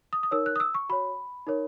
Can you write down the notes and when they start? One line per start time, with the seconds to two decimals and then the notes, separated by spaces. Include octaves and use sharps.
0.13 D#6
0.23 D#6
0.31 D#4 A#4 C#5 E6
0.46 F#6
0.56 D#6
0.60 E6
0.74 C#6
0.89 F#4 C#5 B5
1.47 D#4 A#4 C#5